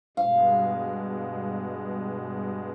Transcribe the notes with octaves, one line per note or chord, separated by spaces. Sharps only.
G2 B2 G#3 F5